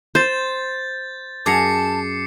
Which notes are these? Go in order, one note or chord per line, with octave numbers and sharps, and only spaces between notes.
C5 G6 A6
F#2 G#4 A5 A#5 D6 C7 C#7